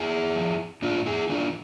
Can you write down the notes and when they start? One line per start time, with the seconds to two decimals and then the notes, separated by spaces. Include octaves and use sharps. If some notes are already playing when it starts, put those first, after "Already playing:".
Already playing: E4 G#4
0.36 F3
0.82 A2 D4 F4
1.06 E4 G#4
1.29 E3 D4 F4